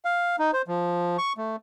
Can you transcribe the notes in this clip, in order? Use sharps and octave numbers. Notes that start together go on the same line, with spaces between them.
F5
D#4
C5
F3
C#6
A3